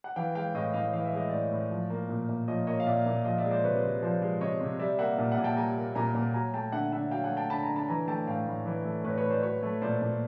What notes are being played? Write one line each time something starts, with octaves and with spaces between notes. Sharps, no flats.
F#5
E3 F5 G5
G#3 F5 G5
A2 D#5 F5
A2 D#5 F5
E3 F5
E5
G#3 D#5
A2 D5 E5
A2
F3
A#3
A#2
A#2
F3 C#5 D#5
A#3 C#5 D#5
F5
A#2 D5 E5
A#2
F3 D#5 F5
D5 E5
G#3
C5 D5
C3 B4 C#5
C3
F3 C5 D5
G#3
C3 C#5 D#5
C3
G3 D5 E5
A#3 E5 F#5
A#2
E5 F#5
A#2 G#5
G5 A5
G3 G#5 A#5
A#3
A#2 G#5 A#5
A#2
F#3 G#5 A#5
A3 G5 A5
D3 E5 F#5
D3 E5 F#5
F#3 F5 G5
F#5 G#5
A3
G5 A5
D3 A5 B5
G#5 A#5
D3
A5 B5
E3 G#5 A#5
A3 G5 A5
A2 F5 G5
A2
E3
A3
A2 B4 C#5
B4 C#5
A2
C5 D5
F#3 B4 C#5
A3
A#2 C5 D5
A#2